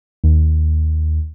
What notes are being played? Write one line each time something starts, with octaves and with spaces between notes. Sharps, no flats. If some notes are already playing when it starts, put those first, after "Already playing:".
D#2